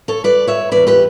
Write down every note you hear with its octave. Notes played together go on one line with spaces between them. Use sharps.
A4 C#5
B4 D5
C#5 E5
E2 B2 B4 D5
G4 B4